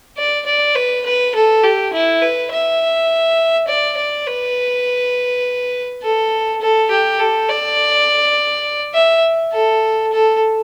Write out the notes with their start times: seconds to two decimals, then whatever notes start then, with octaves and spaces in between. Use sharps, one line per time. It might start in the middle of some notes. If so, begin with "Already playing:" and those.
0.17 D5
0.46 D5
0.75 B4
1.05 B4
1.35 A4
1.63 G4
1.93 E4
2.21 B4
2.52 E5
3.68 D5
3.97 D5
4.27 B4
6.02 A4
6.61 A4
6.90 G4
7.19 A4
7.49 D5
8.94 E5
9.52 A4
10.12 A4